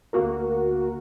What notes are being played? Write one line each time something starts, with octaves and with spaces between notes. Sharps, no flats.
D2 A#3 F#4 A#4